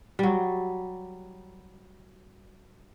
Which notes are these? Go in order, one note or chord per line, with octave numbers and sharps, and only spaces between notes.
F#3 G3